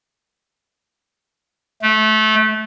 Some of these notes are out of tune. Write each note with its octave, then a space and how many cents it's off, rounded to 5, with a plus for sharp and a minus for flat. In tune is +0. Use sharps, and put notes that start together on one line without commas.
A3 -20